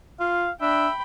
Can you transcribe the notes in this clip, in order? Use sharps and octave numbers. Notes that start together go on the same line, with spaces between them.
F4 F5
D4 E5 G5 B5